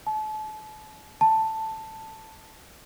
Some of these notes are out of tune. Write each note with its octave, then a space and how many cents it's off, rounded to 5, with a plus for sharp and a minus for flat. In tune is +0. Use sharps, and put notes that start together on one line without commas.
A5 -35
A5 +5